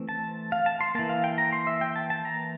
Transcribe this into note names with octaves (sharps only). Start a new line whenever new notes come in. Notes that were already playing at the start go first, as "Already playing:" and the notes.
Already playing: E3 A3 C4
A5
F5
A5
C6
E3 A#3 A5
F5
G5
A#5
C6
E5
G5
A5
A5
A#5